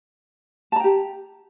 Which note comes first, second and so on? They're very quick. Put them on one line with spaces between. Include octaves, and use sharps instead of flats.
A5 A#5 G5 G4